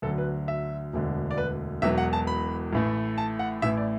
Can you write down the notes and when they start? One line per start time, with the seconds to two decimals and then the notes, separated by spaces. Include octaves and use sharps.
0.02 D2 D3 F#3 A4
0.18 B4
0.48 E5
0.93 E1 D2 D3
1.31 D5
1.38 B4
1.82 E1 E2 B2 F#3 E5
1.98 F#5
2.13 A5
2.27 B5
2.73 A1 A2 A3
3.18 A5
3.39 F#5
3.62 A1 A2 A3 E4 E5
3.77 D5